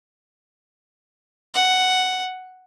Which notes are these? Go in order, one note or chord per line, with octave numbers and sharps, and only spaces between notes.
F#5